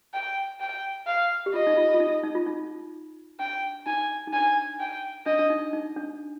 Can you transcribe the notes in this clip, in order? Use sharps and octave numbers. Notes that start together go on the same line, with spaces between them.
G5
G5
F5
G4
F4 D#5
D#4
F4
F4
D#4
D#4
F4
D#4
D4 G5
D#4 G#5
D#4
D4 G#5
G5
D4 D#5
D4
D#4
D#4
D4